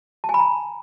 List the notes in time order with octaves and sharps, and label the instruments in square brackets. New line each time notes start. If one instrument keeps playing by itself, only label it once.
[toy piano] A5
G#5
B5
A#5